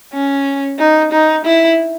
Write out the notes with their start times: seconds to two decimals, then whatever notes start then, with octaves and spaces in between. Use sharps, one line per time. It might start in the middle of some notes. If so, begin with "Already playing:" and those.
0.14 C#4
0.79 D#4
1.12 D#4
1.45 E4